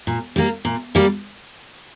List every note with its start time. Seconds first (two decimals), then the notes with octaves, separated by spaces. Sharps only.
0.07 A#2
0.36 G3 A#3
0.65 A#2
0.95 G3 A#3